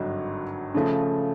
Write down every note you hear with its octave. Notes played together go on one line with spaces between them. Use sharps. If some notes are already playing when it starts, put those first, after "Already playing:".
Already playing: G#1 G2 D3 F#3
C#3 F3 A3